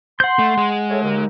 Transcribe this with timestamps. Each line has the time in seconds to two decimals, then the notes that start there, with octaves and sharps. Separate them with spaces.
0.20 F#5 C6 G6
0.39 A3
0.57 G#3
0.90 A3 G#4 C#5
1.04 D#2 D3 D#4